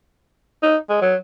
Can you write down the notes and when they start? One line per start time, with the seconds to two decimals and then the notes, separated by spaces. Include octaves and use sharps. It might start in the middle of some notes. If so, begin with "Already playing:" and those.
0.63 D#4
0.89 G#3
1.02 F#3